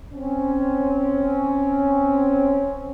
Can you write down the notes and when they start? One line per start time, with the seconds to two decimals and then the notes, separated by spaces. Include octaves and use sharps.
0.14 C4 C#4